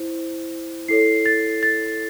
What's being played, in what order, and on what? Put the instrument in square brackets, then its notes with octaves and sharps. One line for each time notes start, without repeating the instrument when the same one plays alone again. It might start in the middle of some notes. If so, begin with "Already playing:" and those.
Already playing: [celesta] E4 C5
E4 A4 C#5 C7
A6
A6